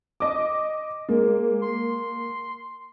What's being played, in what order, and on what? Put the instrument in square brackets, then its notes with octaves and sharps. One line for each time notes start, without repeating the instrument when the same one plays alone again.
[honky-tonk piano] D#5 D6
[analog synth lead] G#3 [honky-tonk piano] A#3
[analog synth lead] C6